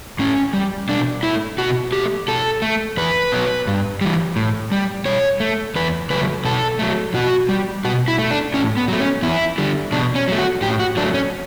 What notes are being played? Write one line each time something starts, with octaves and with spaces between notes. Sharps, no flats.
A2 C#4
G3
B2 D4
A3 E4
B2 F#4
A3 G4
B2 A4
A3
E2 B4
B2 F#3
G2
E3 G3
A2
G3
B2 C#5
A3
E2 B4
C#3 F#3 A3 B4
B2 A4
F#3 A3
B2 F#4
G3
B2 F#4
E4
A3
D4
A2 C#4
B3
F#3 A3
C#4
E2 E4
D3 G3
B2 D4
C#4
F#3 A3
F#4
A2 G4
F#4
F#3 A3 D4
C#4